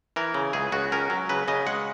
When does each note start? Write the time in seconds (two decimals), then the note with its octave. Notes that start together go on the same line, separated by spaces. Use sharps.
0.16 E3 A#4
0.34 C#3
0.53 C#2 G#4
0.72 C#2 F#4
0.92 C#4 A#4
1.10 F#3
1.29 C#3 B4
1.48 C#3 D#5
1.67 G#3 F#5